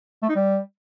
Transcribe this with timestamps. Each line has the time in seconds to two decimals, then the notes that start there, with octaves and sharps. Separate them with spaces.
0.22 A3
0.29 D#4
0.35 G3